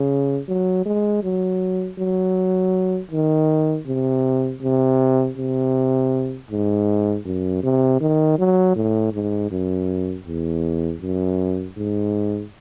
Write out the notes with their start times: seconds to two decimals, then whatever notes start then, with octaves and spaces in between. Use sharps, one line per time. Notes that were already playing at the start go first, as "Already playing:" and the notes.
Already playing: C#3
0.48 F#3
0.86 G#3
1.23 F#3
1.99 F#3
3.11 D#3
3.87 C3
4.62 C3
5.37 C3
6.50 G#2
7.25 F#2
7.63 C3
8.01 D#3
8.39 F#3
8.76 A2
9.14 G#2
9.51 F#2
10.26 E2
11.01 F#2
11.77 G#2